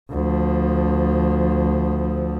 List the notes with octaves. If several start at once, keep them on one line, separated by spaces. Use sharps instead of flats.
D2 F3